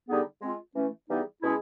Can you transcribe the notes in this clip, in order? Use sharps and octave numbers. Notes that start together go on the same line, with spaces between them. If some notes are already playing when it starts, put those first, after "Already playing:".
D3 G3 B3 D#4 G#4
G#3 C4 F4
E3 A3 C#4
E3 G3 B3 D#4 G#4
B2 G#3 C#4 E4 G#4